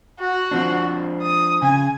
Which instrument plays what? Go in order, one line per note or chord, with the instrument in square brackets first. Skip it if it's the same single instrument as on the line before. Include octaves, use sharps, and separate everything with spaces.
[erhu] F#4
[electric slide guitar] F3 C4 D4
[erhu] D#6
[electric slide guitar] C#3 [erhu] G#5